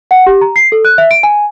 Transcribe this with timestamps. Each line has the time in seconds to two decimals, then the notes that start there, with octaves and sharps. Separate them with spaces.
0.11 F#5
0.27 G4
0.41 A#5
0.56 C7
0.72 A4
0.85 F#6
0.98 E5
1.11 D7
1.23 G#5